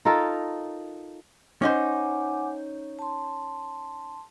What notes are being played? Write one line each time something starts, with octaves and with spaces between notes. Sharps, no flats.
D#4 F4 A4 A#4
C#4 D#4 C5 F#5 G#5 D6
A5 C6